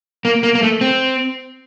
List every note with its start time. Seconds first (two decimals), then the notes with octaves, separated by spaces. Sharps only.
0.25 A#3
0.43 A#3
0.55 A#3
0.63 A3
0.81 C4